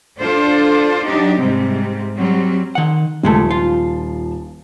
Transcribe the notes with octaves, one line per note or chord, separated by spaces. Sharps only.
D4 F4 A4 C5 D5
F#3 D4 D#4 G4
G#2 C3 G3 C4
F#3 G3 C4
D#3 F#5
D#1 C#2 F3 G#3 A3 A5
F4